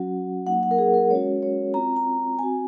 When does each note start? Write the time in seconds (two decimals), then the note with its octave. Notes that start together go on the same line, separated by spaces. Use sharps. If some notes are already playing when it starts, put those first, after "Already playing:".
Already playing: F#3 C#4 F#4 F#5
0.47 F#3 A#3 D#4 F#5
0.63 F#5
0.71 A#4
0.78 G#4
0.94 A#4
1.11 G#3 C#4 F#4 C#5
1.43 C#5
1.74 C4 F4 A#5
1.96 A#5
2.39 C4 F#4 G#5